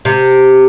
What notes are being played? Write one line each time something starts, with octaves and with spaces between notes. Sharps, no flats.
C3